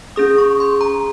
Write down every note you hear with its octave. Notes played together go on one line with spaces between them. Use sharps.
C#4 G#4 D#6
C#6
C6
A#5